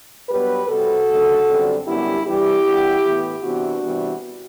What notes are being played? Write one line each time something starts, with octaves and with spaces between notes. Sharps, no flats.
G2 F#3 B3 G4 B4
C3 G3 C4 F#4 A4
F#2 D3 A3
F#2 D3 G3 C4
F#2 D3 G3 B3 E4 G4
G2 E3 G3 E4 G4
G2 E3 B3
A2 E3 B3
C3 E3 B3 D4 F#4
C3 E3 G3 B3